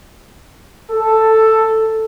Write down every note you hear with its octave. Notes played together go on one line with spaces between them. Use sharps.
A4